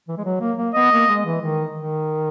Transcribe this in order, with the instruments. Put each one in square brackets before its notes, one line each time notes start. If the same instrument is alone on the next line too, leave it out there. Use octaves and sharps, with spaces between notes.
[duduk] E3
G#3
F#3
A#3
A#3
[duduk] B3 [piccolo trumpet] D#5
[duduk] A#3
G#3
E3
D#3
D#3